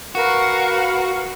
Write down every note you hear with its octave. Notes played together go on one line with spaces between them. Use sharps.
F#4 A#4 B4 F5